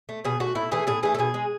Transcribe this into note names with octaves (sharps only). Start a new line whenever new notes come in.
A3
B2 G#4
A3 F#4
A2 E4
E3 A3 G#4
A2 G#4
E3 A3 G#4
A4
B2 G#4
G#3